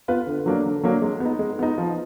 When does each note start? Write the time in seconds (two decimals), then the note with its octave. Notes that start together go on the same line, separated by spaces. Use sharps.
0.08 B3 F4 B4
0.27 D3
0.46 F#3 A#3 D4
0.65 D3
0.83 F#3 A#3 D4
1.02 G#3
1.20 B3 D#4
1.39 G#3
1.59 B3 D#4
1.78 F3